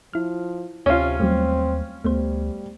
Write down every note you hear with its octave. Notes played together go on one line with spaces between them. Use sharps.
F3 E4 F6
D2 C3 C#4 F4
D#2 F#3 G3 A3 C4
D2 G3 A3 B3 C5